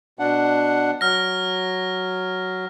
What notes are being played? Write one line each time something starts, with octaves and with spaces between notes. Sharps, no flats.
B2 D4 F#5
F#3 F6 A#6